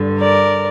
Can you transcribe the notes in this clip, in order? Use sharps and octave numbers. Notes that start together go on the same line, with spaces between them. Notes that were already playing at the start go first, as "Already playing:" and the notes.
Already playing: G2 D3
A#4 D5